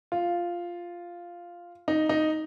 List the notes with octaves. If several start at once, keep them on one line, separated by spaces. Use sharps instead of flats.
F4
D#4
D#4